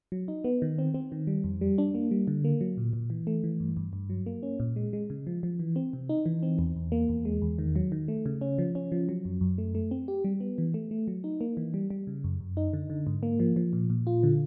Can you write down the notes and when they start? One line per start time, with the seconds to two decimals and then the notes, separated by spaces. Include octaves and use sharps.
0.12 F#3
0.28 D#4
0.44 B3
0.62 D#3
0.78 C4
0.94 C4
1.12 D#3
1.27 G3
1.44 F2
1.61 G3
1.78 D4
1.94 A#3
2.11 G3
2.27 D3
2.44 A#3
2.61 F#3
2.77 A#2
2.93 A#2
3.10 E3
3.27 A3
3.44 E3
3.60 G2
3.77 G2
3.93 G2
4.10 F#3
4.26 A#3
4.43 C#4
4.60 A#2
4.76 G#3
4.93 G#3
5.10 C#3
5.27 F3
5.43 F3
5.59 E3
5.76 C4
5.93 C3
6.09 D#4
6.26 E3
6.43 C4
6.59 E2
6.76 E2
6.92 A#3
7.09 E2
7.25 G#3
7.42 E2
7.58 D#3
7.76 F#3
7.92 D#3
8.08 A3
8.26 C#3
8.41 C#4
8.58 F3
8.75 C#4
8.92 F3
9.09 F#3
9.25 F#2
9.41 F#2
9.58 A3
9.75 A3
9.91 C4
10.08 G4
10.24 G3
10.41 B3
10.58 E3
10.74 A3
10.91 A3
11.08 F#3
11.24 D#4
11.41 A#3
11.57 E3
11.74 G3
11.90 G3
12.07 C#3
12.24 F#2
12.40 F#2
12.57 D#4
12.73 D3
12.90 D3
13.07 G#2
13.23 A#3
13.40 F3
13.56 F3
13.73 A#2
13.90 A#2
14.07 F4
14.23 D3